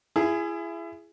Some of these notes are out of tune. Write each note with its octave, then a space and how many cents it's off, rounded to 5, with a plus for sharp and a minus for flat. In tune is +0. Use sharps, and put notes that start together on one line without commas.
E4 +30 G#4 +0